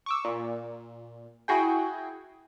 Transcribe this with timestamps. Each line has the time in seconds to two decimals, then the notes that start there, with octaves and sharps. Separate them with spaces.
0.06 C#6 D6 E6
0.24 A#2
1.48 E4 F#4 G#4 G5